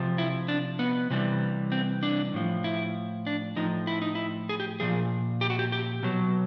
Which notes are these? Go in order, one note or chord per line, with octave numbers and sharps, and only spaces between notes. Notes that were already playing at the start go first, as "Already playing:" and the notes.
Already playing: C3 F3
E4
D4
B3
C3 E3 G3
C4
D4
A2 F3
E4
D4
A2 F3 D#4
E4
D#4
E4
G#4
G4
A#2 F3 G#4
G4
F#4
G4
G4
B2 F#3